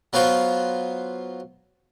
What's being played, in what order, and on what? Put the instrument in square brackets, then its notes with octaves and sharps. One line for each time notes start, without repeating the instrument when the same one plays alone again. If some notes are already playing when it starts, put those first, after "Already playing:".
[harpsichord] F#3 B3 F4 F#4 C5